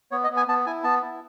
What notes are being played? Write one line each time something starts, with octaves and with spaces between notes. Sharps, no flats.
B3 C#5
D#5
B3
G#5
B3 A5
E4 G#5
B3 A5
E4